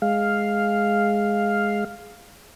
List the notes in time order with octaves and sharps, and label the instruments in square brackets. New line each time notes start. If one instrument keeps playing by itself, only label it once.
[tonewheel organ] G#3 F5